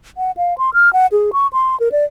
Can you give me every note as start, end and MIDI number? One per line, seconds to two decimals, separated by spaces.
0.18 0.31 78
0.37 0.57 77
0.58 0.70 84
0.74 0.92 89
0.93 1.06 78
1.12 1.31 68
1.33 1.47 85
1.53 1.78 84
1.80 1.89 70
1.92 2.05 74